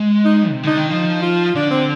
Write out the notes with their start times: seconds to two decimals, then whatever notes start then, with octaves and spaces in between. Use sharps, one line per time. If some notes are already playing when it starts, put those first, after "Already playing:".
Already playing: G#3
0.25 D#4
0.51 C3
0.63 D3 D#4
0.77 D#3
0.89 F3 D#4
1.22 F4
1.55 D3 D4
1.71 C4